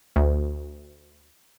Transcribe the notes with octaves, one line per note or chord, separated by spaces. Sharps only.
D2